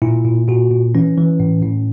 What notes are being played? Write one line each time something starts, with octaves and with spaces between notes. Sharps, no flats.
A#2 E4
A#2
A#2 F#4
A#2
E3 C#4
E3
A2
A2